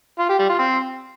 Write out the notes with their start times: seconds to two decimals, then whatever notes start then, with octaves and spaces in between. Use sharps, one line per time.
0.19 F4
0.29 G4
0.39 G3
0.49 F4
0.59 C4